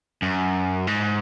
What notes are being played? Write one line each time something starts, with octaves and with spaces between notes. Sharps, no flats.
F#2
G#2